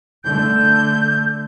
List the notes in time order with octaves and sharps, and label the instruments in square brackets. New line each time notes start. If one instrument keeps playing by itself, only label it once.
[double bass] D3 A3 [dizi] G6